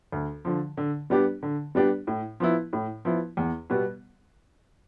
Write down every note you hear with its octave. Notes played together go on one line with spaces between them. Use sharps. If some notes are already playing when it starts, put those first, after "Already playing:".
D2
D3 F3
D3
G3 B3 D4 G4
D3
G3 B3 D4 G4
A2
F3 B3 E4
A2
F3 B3 E4
E2
B2 G3 B3